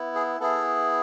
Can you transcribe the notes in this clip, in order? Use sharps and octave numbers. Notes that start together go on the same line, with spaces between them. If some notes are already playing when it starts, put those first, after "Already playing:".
Already playing: B3 E4
G#4
B3 E4 G#4 A4